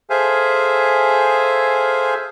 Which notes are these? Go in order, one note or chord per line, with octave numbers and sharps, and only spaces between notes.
G#4 A4 C5 E5 F5 G#5